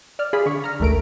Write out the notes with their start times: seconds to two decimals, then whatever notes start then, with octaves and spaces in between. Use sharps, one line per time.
0.19 D5 F6
0.33 F4 G#4 D5 B5
0.46 D3 C#6
0.64 A#5 F6
0.80 A1 D2 A3 A#4 D7